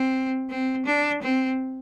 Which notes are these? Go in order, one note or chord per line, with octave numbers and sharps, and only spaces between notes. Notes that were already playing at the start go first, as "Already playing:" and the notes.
Already playing: C4
C4
D4
C4